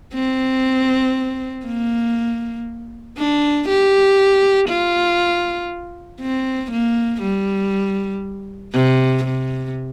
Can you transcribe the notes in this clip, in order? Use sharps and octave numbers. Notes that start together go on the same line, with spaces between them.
C4
A#3
D4
G4
F4
C4
A#3
G3
C3
C3